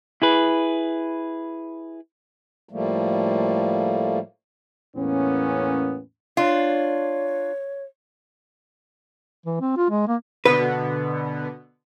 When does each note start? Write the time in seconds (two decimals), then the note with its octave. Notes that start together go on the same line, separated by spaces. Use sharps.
0.22 E4 G#4 B4
2.69 A2 F3 G3 A3 A#3
4.96 E2 A2 A#3 B3 C#4
6.37 D4 F4 C#5
9.46 E3
9.60 C4
9.77 F4
9.90 G#3
10.08 A#3
10.45 B2 D3 B3 B4